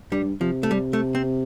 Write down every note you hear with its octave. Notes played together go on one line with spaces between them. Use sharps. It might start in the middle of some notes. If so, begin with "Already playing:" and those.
G2 G3
C3 F3
A3
G3
A3
C4